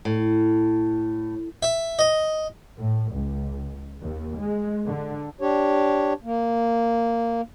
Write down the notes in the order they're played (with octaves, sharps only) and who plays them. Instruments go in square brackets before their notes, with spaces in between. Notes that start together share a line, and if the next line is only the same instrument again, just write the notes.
[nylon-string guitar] A2
[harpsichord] E5
D#5
[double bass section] A2
C#2
D#2
G#3
D3
[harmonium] D4 G4 C#5
A#3